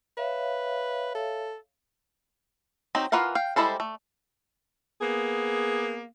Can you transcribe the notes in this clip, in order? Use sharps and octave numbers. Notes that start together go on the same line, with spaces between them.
B4 C#5 E5 F5
A4
F#3 C4 D#4
E3 F4 A#4 F5 F#5
F5 G5
G3 G#3 E4 A4 C5
A3
A#3 B3 G#4